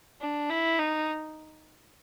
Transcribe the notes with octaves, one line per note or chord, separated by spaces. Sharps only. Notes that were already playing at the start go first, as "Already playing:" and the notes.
D4
E4
D#4